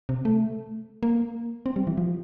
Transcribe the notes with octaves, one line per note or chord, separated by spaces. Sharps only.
C3
A3
A#3
C4
G3
E3
F3